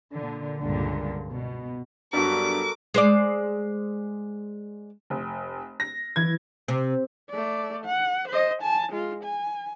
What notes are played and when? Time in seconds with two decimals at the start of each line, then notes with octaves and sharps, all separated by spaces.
0.15 A#2 D3
0.61 C#2 G2 A#2 D3
1.28 B2
2.13 G2 F#3 G3 B3 F#4 A4 A#4 D6
2.94 G#3 C5 D5
5.10 F1
5.80 A#6
6.16 E3 G#6
6.68 C3
7.30 A3 D5
7.85 F#5
8.29 C5 D#5
8.62 G#5 A5
8.93 G#3 F4
9.24 G#5